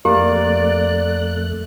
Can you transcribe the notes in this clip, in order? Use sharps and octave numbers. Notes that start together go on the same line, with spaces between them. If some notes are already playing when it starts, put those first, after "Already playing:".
F2 A3 A#3 G4 D5 F#6